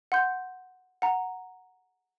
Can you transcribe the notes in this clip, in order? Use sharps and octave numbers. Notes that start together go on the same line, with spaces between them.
F#5 C6 G6
F#5 A#5